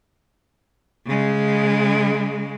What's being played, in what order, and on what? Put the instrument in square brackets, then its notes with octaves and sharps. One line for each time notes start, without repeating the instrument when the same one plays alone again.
[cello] C#3 G#3